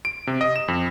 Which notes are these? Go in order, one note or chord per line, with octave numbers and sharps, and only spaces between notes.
D7
C3
D#5
E7
F2